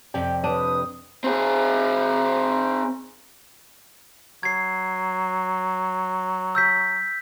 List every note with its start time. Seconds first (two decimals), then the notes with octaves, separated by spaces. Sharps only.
0.14 F2 C3 G4 D5
0.44 D4 B4 D#6
1.24 C4 G#4
4.43 F#3 G#6 C7
6.55 E6 G6 B6